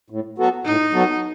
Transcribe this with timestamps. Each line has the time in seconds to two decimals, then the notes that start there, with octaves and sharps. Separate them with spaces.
0.10 A2
0.38 F#3 B3 F#4 A4
0.65 A2 D#4
0.93 F#3 B3 F#4 A4